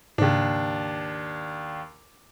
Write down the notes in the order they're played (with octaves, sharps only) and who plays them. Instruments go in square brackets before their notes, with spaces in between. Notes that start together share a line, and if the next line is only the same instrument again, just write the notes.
[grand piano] D#2 D4 [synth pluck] G#2 C#3